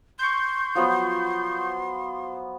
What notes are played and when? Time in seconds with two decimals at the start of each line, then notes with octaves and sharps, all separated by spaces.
0.19 C6 C#6 G6
0.75 F3 F#3 B3